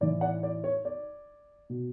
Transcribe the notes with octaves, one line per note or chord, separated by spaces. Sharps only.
A2 E3 D5
D5 F#5
D5
C#5
D5
B2